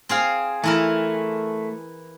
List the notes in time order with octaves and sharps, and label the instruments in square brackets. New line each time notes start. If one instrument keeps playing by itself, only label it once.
[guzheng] C4 G#4 F5
[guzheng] E3 E4 A#4 [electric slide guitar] A3